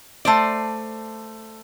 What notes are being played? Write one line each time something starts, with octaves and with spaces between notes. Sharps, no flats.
A3 C5 D5